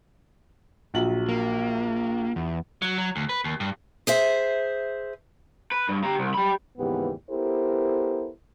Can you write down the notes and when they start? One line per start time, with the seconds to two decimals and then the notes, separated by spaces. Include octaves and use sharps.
0.94 A#1 F#3 F#7
1.29 A#3
2.36 E2
2.82 F#3
2.98 F#3
3.16 D2
3.29 B4
3.44 D#2
3.60 G2
4.07 G#4 C5 E5
5.72 B4
5.89 G2
6.04 G4 A#5
6.19 C2
6.34 G4 B5
6.78 D#2 G#2 C#3 E3 B3 G4
7.30 B3 E4 G4 A4 A#4 C5